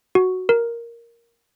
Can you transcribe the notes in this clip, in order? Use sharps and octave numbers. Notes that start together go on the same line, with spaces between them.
F#4
A#4